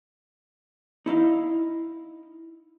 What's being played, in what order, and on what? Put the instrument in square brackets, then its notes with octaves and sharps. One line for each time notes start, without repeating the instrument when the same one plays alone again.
[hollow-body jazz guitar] D#4 E4 D#5 F5